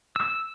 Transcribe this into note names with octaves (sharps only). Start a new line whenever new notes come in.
E6